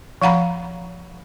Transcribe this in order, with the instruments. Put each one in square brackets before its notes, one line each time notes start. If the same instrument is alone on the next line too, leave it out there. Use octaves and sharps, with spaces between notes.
[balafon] F3 F5 F#5 A#5 B5